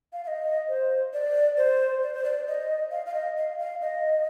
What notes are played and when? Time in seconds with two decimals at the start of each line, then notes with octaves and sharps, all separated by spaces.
0.13 F5
0.24 F5
0.28 D#5
0.69 C5
1.13 D5
1.57 C5
2.02 D5
2.14 C5
2.24 D5
2.48 D#5
2.91 F5
3.06 F5
3.14 D#5
3.37 F5
3.59 F5
3.81 D#5